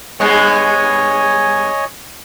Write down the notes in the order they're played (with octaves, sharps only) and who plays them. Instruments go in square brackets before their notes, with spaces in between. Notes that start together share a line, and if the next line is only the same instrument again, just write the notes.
[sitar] G2 G#3 B3 [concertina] C#5 D#5 G#5